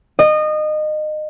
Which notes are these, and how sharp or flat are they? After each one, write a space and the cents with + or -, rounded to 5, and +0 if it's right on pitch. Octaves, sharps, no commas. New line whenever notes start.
D#5 -25